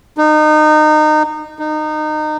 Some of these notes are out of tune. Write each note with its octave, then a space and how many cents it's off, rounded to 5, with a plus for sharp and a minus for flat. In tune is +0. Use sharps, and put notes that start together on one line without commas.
D#4 -25
D#4 -25